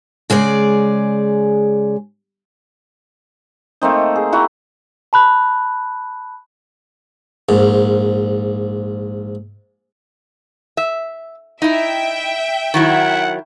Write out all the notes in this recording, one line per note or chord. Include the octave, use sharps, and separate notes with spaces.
C#3 G#3 G#4 D5
A3 A#3 C4 D#4
G#4
E4 F#4 A#5
A5 B5 F#6
A#1 G#2
E5
D#4 E4 E5 G5
D#3 F#3 E4 F#5